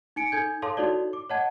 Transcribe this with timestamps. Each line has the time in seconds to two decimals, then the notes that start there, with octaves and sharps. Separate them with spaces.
0.16 D#4 G#5 C#7 D7
0.32 D#4 A4 G#5 G6 G#6
0.62 A4 C#5 F5 A5 C6 D6
0.77 D#4 E4 F#4 A4 C#5 D5
1.13 D6
1.30 C#5 D#5 F#5 A5 G#6